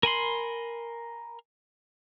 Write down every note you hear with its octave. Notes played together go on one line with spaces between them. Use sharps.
A#4 G#5 B5 C6